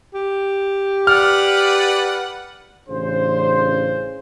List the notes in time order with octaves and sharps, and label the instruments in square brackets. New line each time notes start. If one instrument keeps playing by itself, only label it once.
[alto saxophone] G4
[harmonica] B4 D5 F#5 [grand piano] F6
[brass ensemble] A1 C#3 D4 C5